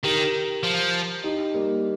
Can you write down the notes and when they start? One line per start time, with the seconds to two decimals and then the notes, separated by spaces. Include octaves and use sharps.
0.03 D#3 G4 A#4
0.63 F3
1.24 D#4 G4
1.54 G3 A#3